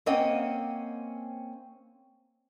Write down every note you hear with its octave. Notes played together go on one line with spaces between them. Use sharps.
A#3 C4 C#4 D#5 F#5 G5